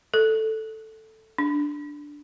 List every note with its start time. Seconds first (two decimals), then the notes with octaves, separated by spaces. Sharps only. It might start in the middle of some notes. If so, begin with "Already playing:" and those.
0.14 A4
1.38 D4